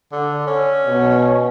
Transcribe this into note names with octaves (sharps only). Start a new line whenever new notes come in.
D3
C#4
B2